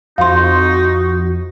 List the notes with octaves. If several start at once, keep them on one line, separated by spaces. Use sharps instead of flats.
F2 D#4 F#4 F5 C6